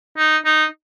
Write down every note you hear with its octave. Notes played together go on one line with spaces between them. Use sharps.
D#4
D#4